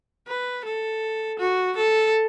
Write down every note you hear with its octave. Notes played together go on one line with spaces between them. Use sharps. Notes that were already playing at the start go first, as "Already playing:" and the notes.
B4
A4
F#4
A4